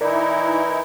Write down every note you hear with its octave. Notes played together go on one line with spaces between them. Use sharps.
E3 D#4 E4 A#4 D5